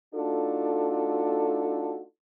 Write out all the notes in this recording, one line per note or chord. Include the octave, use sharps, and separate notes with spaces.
A3 D4 D#4 F4 F#4 A4